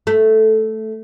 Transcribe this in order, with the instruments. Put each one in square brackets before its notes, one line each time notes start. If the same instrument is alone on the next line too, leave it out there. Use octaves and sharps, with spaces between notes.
[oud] A3